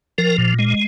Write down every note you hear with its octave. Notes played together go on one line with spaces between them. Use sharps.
F3 A#4
A#2
G#3